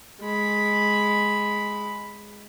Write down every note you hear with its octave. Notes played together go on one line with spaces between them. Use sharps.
G#3 B5